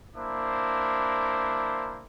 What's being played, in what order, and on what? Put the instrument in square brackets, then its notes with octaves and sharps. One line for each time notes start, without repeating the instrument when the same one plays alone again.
[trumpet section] A#3 D4 E4 C5 D6